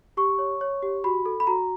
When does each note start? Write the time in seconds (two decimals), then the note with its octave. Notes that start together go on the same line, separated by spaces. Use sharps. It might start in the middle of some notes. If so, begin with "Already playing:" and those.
0.17 G4 C#6
0.38 C#5
0.61 C#5
0.83 G4
1.04 F#4 B5
1.26 A4
1.40 B5
1.47 F#4 A#5